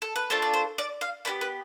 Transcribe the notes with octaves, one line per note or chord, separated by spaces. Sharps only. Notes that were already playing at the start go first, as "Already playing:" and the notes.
A4
B4
A3 D4 F4 A4 C5
D5
C5
D5
F5
B3 D4 G4 D5
B4